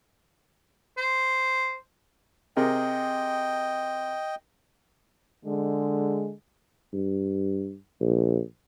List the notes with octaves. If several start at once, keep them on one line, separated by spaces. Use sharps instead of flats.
C5
C3 G#4 A#4 D#5 G5
D3 G#3
G2
A#1